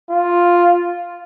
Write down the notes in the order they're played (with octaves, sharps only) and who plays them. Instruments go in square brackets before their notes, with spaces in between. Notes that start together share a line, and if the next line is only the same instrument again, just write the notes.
[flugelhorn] F4